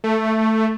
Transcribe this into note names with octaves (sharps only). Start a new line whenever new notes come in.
A3